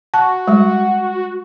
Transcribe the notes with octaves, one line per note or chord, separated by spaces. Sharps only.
F#4 A5
G3 G#3